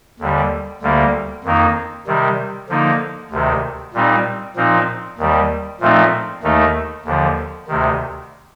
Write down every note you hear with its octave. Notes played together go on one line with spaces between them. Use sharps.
D#2 D3 G3
D2 D3 G3 A#3
F2 D#3 A#3 D#4
C3 D#3 G3
D3 F3 A#3 D#4
D2 C3 D#3
A#2 G3 C4 D#4
A#2 F3 C4 D#4
D#2 D#3 G3
A#2 F3 A3 C4 D#4
D#2 D#3 A3 D#4
D#2 D3 F3
D2 C3 D#3